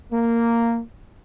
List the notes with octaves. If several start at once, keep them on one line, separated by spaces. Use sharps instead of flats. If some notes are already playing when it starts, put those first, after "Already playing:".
A#3